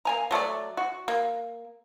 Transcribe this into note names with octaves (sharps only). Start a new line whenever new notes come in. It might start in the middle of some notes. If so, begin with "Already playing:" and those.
A#3 G#5 A#5
F#3 A3 A4 D5
F#4
A#3